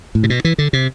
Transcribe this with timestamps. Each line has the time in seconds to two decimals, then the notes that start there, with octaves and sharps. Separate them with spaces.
0.15 A2
0.23 C3
0.30 B2
0.45 E3
0.58 D3
0.73 C3